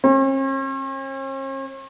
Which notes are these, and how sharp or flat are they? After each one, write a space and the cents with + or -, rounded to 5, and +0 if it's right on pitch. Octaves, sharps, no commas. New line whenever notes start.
C#4 -45